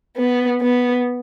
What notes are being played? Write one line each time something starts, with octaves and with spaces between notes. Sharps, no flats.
B3
B3